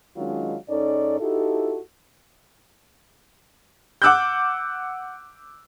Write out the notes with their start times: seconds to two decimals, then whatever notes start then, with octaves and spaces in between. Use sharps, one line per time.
0.17 D#3 F#3 G#3 C#4 D4 F4
0.69 G#2 C#4 D#4 A4 D5
1.20 D#4 E4 F#4 G4 A4
4.02 F#5 D6 E6 F#6 G6